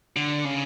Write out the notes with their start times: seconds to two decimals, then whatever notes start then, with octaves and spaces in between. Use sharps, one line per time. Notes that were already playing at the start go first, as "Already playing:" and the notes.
0.16 D3
0.45 C#3